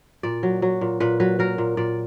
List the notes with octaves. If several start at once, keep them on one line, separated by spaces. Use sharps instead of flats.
A#2 D5
F#3
F#3
A#2
A#2 B4
F#3 B4
F#3 A#4
A#2
A#2 D5